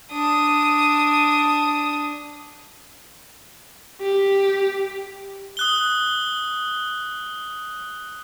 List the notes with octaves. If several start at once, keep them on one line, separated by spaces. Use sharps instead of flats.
D4 D#6
G4
D#6 F#6 G7